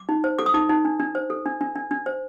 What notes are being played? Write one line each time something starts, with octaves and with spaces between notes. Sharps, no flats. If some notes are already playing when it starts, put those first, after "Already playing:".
Already playing: D6
D#4
C5
A4 D6
D#6
D#4 D6
D#4
D4
D4
C5
A4
D4
D4
D4
D4
C5